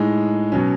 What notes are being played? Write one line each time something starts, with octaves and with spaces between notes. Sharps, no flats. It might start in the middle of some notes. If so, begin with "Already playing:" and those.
Already playing: A2 G#3 D#4
B2 F#3 C#4